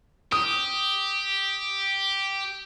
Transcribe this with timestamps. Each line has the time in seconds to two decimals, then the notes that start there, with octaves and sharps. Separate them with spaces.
0.32 G4 D#6